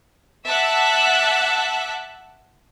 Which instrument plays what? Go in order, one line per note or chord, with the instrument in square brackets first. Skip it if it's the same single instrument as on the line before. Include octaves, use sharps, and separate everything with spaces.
[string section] E5 F#5 A5 D6 E6 F#6